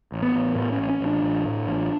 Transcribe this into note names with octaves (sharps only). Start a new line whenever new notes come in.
A1
B3
A1
A2 B3
C#4
A1
C#4
A1
D4
A1
A2
A1